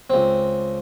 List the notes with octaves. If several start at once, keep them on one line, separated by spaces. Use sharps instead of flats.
C#2 C4